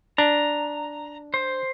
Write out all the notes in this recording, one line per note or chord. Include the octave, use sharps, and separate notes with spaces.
D4 A#5
C5